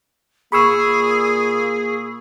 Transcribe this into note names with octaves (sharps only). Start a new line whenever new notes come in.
A#2 A#3 G#4 B5 C#6 E6